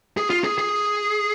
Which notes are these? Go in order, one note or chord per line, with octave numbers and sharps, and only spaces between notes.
G#4
F4
G#4
G#4